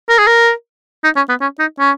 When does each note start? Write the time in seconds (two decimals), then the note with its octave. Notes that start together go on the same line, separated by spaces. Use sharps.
0.09 A#4
0.18 G#4
0.27 A#4
1.04 D#4
1.16 C#4
1.29 B3
1.41 C#4
1.59 D#4
1.79 C#4